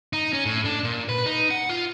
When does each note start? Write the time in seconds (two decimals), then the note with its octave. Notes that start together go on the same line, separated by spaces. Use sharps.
0.13 D#4
0.33 C#4
0.45 A2
0.65 D4
0.84 A#2
1.09 B4
1.26 D#4
1.50 F#5
1.69 F4